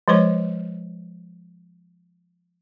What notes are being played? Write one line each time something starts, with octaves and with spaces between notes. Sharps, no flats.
F3 G#3 C5 C#5 C#6